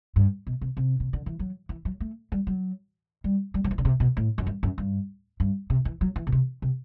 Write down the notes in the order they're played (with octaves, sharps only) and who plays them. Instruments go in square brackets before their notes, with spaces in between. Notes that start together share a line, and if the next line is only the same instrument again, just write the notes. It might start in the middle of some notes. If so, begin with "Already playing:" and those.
[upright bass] G2
B2
C3
C3
C3
D3
E3
F#3
E3
F#3
A3
G3
F#3
G3
G3
F#3
E3
D3
C3
B2
A2
F#2
G2
F#2
G2
G2
C3
E3
F#3
E3
B2
C3
C3